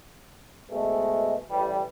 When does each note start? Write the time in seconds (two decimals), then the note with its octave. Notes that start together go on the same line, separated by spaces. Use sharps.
0.70 G#2 B2 G#3 A3
1.50 A1 E3 G3